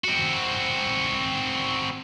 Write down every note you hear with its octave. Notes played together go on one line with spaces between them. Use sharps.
C4 F#4